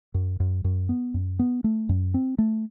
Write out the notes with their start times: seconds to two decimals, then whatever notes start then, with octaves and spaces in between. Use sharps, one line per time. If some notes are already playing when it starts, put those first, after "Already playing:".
0.14 F#2
0.40 F#2
0.64 F#2
0.89 B3
1.14 F#2
1.39 B3
1.64 A3
1.89 F#2
2.14 C4
2.38 A3